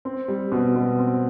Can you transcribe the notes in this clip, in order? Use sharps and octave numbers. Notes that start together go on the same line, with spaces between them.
C4
G3
B2
B2
C4